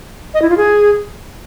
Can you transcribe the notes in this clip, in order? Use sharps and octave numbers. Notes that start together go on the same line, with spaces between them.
D#5
E4
F4
G#4